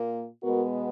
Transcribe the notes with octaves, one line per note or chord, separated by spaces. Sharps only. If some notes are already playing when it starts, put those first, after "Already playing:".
Already playing: A#2 A#3
B2 G#3 B3 F#4 A#4